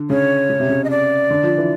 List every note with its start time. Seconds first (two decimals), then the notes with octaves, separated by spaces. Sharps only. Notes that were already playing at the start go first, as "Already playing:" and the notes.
Already playing: D3
0.10 C#3 C#5
0.50 C#3
0.60 C3
0.69 C#3
0.84 D#5
0.90 D5
1.30 D3
1.43 F3
1.57 E3